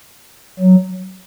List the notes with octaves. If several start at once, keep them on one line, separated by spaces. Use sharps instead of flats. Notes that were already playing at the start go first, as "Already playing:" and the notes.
F#3